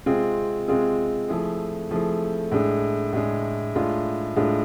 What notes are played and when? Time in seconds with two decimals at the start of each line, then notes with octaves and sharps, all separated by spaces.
0.06 C3 G#3 C4 F4 G#4
0.68 C3 G#3 C4 F4 G#4
1.29 F3 A3 E4 G#4
1.91 F3 A3 E4 G#4
2.52 A2 G#3 D4 G#4
3.13 A2 G#3 D4 G#4
3.75 A2 G#3 D4 F4 G#4
4.36 A2 G#3 D4 F4 G#4